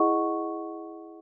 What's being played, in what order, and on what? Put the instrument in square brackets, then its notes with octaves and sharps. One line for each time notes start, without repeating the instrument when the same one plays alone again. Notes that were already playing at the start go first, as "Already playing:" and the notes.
Already playing: [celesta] E4 G#4 D#5 F#5 C#6